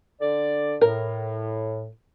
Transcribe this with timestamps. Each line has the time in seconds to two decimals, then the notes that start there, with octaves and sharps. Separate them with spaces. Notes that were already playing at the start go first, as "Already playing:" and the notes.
0.21 D3 D5
0.81 A2 A#4